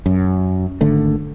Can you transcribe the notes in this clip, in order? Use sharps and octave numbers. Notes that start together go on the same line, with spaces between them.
F#2
G#1 D3 A3